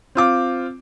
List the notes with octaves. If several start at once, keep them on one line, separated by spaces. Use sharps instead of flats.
C4 F4 D6